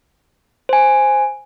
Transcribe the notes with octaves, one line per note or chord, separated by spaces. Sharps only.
C5 G#5